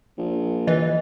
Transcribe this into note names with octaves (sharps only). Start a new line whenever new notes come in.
A#1
E3 D#5